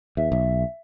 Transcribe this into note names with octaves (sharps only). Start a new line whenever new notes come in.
D#2 E5
B1 E5